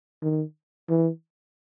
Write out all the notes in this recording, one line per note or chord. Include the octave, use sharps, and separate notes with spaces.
D#3
E3